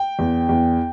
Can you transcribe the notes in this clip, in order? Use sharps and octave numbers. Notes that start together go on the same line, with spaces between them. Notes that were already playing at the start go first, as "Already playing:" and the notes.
Already playing: G5
E2
E2